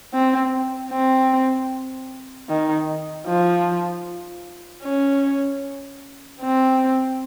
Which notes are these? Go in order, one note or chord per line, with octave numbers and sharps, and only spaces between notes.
C4
C4
D#3
F3
C#4
C4